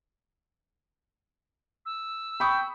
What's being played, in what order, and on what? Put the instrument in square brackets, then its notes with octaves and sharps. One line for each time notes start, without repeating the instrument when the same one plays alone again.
[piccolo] E6
[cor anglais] G5 [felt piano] B5 C#6 D#6